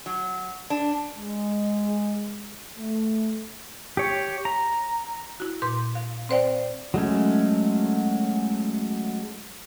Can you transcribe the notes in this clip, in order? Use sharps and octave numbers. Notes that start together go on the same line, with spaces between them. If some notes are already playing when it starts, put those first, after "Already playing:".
F#3
D4
G#3
A3
G4 C#5
A#5
E4 F#4
A#2 B4 C6 G6
F5
C4 B4 C5 D5 F5 G5
F#3 G#3 A3 C#4